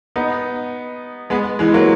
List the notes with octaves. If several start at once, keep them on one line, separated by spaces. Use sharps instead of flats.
B3 D#4
G#3 B3
E3 G#3
F#3 A#3